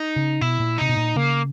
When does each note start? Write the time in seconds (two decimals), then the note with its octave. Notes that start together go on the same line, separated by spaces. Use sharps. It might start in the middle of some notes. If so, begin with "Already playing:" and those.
Already playing: D#4
0.16 C#3
0.41 B2 E4
0.60 A#2
0.78 C3 D#4
0.89 B2
0.97 A#2
1.16 C#3 A#3